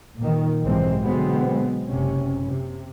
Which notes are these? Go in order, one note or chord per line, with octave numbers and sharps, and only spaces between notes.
A#2 D#3
B1 G#2 C3 E3 G#3 C4
B2 D3 F#3 G#3 B3 C4
F#1 C3 C#4
C3